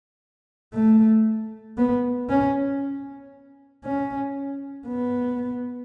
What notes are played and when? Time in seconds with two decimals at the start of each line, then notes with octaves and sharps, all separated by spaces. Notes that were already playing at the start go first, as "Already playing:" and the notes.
0.74 A3
1.77 B3
2.29 C#4
3.84 C#4
4.87 B3